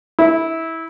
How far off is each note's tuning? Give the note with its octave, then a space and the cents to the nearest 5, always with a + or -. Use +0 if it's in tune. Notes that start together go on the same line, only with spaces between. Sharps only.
E4 -20